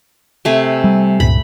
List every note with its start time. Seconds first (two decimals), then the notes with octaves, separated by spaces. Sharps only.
0.45 C3 A3 G#5
0.84 G3
1.20 C#2 G2 A#2 B5